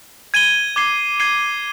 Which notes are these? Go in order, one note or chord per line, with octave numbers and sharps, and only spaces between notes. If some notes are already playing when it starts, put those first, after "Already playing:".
G#6 D#7 G7
D6 G#6 C7 G7
G#6 C7 D#7 G7